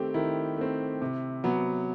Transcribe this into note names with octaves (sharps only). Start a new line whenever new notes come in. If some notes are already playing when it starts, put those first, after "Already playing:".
Already playing: D#3 A3 C4 G4
D#3 E4
A3 C4
C3
F#3 B3